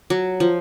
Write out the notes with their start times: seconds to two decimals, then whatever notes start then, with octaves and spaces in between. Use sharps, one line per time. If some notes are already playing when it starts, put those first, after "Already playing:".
0.10 F#3
0.40 F3